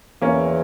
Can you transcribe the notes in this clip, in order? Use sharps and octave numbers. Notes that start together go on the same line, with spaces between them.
E2 A#3 C#4